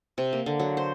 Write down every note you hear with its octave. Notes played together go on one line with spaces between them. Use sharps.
C3
A#3
D3
F#3
C5